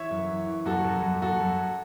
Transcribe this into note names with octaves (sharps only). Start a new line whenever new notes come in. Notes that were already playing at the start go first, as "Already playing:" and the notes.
Already playing: E3 C#5 E5
F#2
E3
E3
F#2 F#4 A4
F#2
F#2
F#2 F#4 A4
F#2